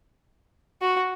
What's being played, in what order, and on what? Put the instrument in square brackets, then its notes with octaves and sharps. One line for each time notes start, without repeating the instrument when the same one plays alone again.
[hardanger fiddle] F#4